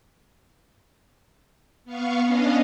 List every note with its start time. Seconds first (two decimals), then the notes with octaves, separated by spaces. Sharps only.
1.85 B3 F5 C#6
2.22 B3 C#4 D4 D#5 F5